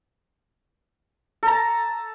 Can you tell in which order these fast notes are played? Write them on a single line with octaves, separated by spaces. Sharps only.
A4 A#5 A5